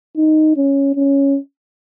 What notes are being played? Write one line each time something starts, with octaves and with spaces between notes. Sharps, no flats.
D#4
C#4
C#4